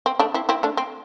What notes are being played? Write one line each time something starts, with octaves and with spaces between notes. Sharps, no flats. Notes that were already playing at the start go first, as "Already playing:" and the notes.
C4
A3 D4
C4 E4
C4 E4
A3 D4
C4